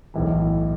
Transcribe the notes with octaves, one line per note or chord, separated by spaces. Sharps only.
B1 A2 E3